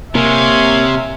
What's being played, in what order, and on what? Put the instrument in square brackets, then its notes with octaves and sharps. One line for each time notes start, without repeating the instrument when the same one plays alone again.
[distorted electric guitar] C3 [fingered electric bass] A#3 [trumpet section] C#5 F5 G#5 [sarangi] E5